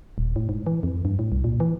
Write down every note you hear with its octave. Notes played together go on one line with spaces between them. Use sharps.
D#1
A2
G#2
E3
F2
G2
A2
C2
A#2
E3